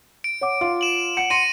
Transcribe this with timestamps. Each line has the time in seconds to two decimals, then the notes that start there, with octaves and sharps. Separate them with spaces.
0.24 D7
0.41 C#5 F#5 D6
0.61 F4
0.81 E7 F#7
1.17 F#5 C#7
1.30 C6 A#6 C#7 D#7